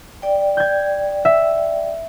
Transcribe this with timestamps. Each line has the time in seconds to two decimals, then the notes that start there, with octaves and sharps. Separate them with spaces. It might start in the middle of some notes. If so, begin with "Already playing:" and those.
0.22 D5 G5
0.57 G6 G#6
1.25 E5